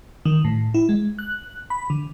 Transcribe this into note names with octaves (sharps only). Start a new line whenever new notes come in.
D#3
A2
E4
G#3
F#6
B5
D3